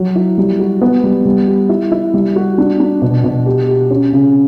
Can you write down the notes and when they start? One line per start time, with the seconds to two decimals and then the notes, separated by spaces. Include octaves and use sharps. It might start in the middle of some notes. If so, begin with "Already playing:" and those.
Already playing: F#3 F#4
0.16 E4
0.38 G3
0.59 F#4
0.81 B3
1.04 G3
1.26 G3
1.48 G4
1.69 E4
1.92 E4
2.14 G3
2.36 F#4
2.58 D4
2.80 D4
3.02 B2
3.24 B2
3.46 G4
3.68 G4
3.90 C#4
4.13 C#3